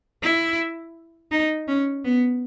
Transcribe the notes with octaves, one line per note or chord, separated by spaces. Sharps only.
E4
D#4
C#4
B3